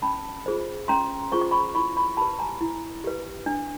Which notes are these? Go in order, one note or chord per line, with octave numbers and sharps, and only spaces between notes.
C#4 A5 B5
F4 G#4 C5
C#4 A#5 C6
F4 G#4 C5 C#6
D6
B5 C#6
E4 B5 C#6
B5 C#6
G4 B4 A5 B5
G#5 A#5
E4
G4 B4
D4